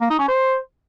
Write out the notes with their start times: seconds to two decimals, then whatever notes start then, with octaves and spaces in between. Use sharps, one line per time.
0.01 A#3
0.10 D#4
0.19 C#4
0.28 C5